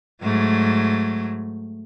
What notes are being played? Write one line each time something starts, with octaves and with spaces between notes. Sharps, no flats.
G#2 F#3 A3